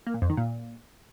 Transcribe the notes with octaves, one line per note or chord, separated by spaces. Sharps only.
A#3
A#2
F2
D#3
A#2